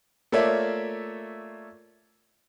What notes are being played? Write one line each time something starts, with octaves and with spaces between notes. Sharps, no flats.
A3 A#3 F4 C#5 D5 E5